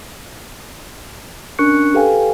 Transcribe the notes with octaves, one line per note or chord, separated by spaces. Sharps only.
C#4 D4 A#4 C#6 F#6 C#7
G4 A4 B4 F5 G5 G#5